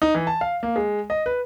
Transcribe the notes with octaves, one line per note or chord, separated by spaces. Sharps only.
D#4
E3
A5
F5
A#3
G#3
D#5
B4